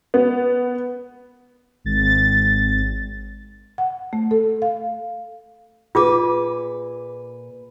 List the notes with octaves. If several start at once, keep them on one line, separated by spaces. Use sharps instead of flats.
B3
G#1 A6
F#5
A3
A4
F5
A#2 F4 G#4 B4 D6